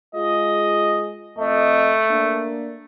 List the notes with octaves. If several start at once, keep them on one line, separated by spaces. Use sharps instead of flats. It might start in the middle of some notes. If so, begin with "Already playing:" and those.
G#3 F4 G#4 D#5
F2 A3 C4 D#5
A#3 D4